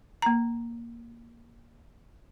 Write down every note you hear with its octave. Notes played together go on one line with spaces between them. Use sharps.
A#3 A#5